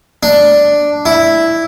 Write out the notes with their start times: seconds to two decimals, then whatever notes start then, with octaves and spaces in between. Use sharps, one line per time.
0.23 D4
1.05 E4